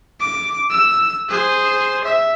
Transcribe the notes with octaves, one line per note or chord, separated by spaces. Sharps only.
D6
E6
G#4 C5
E5